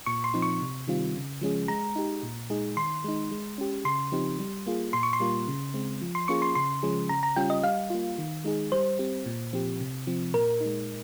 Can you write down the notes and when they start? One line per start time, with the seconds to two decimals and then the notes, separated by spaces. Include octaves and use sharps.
0.06 A#2 C#6
0.24 C6
0.34 F3 C4 D#4
0.42 C#6
0.61 C3
0.87 D#3 G3 C4 F4
1.15 C#3
1.41 F3 G#3 C#4 G#4
1.68 G#3 A#5
1.96 D#4 G4
2.23 A#2
2.50 G#3 D#4 G#4
2.77 D#3 C6
3.04 G#3 D#4
3.31 G#3
3.58 C#4 G4
3.85 C#3 C6
4.12 F3 C4 D#4 G4
4.39 G3
4.67 A#3 F4 G#4
4.93 A#2 C6
5.03 C#6
5.13 C6
5.20 G3 A#3 F4
5.48 C#3
5.74 G#3 C4
6.01 F3
6.15 C6
6.28 A#3 C#4 F4 G#4 C#6
6.42 C6
6.55 C#3 C6
6.83 F3 G#3 C#4 G#4
7.09 C#3 A#5
7.23 A#5
7.36 G3 C#4 F4 G5
7.50 D#5
7.63 G3 F5
7.90 A#3 F4
8.18 D#3
8.44 G#3 D#4 G#4
8.72 G3 C5
8.99 C4 G4
9.26 A#2
9.53 F3 C4 G4
9.80 C3
10.07 F3 C4
10.33 A#2 A#4
10.61 D#4
10.66 G#3